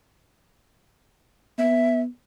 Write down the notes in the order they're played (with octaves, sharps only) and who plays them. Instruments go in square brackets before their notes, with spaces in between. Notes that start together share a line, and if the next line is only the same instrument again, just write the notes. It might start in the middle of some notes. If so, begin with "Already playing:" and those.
[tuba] B3 [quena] E5